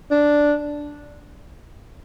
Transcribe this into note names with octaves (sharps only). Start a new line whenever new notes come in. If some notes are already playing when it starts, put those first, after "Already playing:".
D4